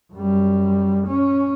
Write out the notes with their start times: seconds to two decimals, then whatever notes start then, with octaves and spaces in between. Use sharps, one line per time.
0.13 F#2 G3
1.07 C#4